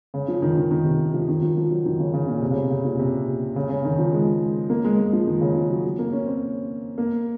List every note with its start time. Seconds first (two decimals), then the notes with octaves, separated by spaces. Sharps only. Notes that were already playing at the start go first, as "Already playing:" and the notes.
0.14 C#3
0.28 F3
0.42 D#3
0.57 D#3
0.71 D#3
0.85 C3
1.14 F3
1.29 D#3
1.42 F3
1.57 F3
1.71 F#3
1.85 D#3
2.00 C#3
2.14 C#3
2.28 A#2
2.42 C3
2.51 C#3
2.56 C3
2.70 C#3
2.85 A#2
2.99 C3
3.56 C#3
3.70 C#3
3.85 D#3
3.99 F3
4.13 G#3
4.70 A#3
4.85 G#3
4.98 G#3
5.13 F3
5.27 D#3
5.41 C#3
5.55 F3
5.70 F#3
5.99 A#3
6.13 C#4
6.26 C4
6.98 A#3